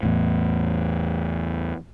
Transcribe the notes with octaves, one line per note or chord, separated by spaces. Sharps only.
E2 A2